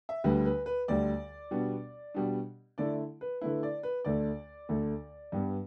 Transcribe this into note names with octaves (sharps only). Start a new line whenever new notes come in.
E5
D2 D3 G3 B4
B4
B4
D2 D3 G3 D5
B2 G3 B3 D4
B2 G3 B3 D4
D3 A3 E4 D5
B4
D3 A3 E4 B4
D5
B4
D2 D3 A3 D5
D2 D3 A3
G2 G3 B3